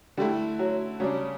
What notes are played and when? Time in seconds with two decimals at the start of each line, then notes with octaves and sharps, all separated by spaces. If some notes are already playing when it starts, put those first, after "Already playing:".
0.17 D3 G3 A3 E4
0.59 F#3
1.00 C#3 F#3 G3 D4